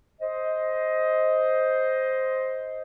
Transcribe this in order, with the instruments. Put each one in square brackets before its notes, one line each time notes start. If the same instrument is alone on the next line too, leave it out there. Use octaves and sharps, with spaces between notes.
[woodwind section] C5 D#5